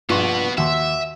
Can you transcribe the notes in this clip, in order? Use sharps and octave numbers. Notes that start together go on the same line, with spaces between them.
A#1 G2 B3 F4 F#4 C#6
D#2 F#4 E5 C6